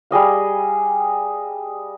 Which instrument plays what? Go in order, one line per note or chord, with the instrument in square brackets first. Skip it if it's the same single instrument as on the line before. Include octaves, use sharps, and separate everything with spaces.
[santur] G3 G#4 D#5 F5